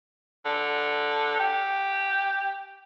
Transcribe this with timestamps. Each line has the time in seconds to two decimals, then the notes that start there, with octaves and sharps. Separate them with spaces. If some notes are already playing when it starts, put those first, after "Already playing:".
0.45 D3
1.40 G4